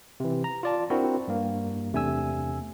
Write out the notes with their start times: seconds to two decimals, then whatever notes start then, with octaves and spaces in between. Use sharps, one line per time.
0.20 C3 E3
0.44 A#5
0.63 F4 D5 A5
0.90 C4 D4 E4 F#4 A#4
1.28 G2 A#3
1.92 E2 C3 A3 D4 G#5 E6